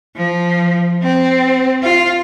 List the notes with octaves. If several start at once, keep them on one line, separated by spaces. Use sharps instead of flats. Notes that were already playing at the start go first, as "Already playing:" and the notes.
F3
C4
F4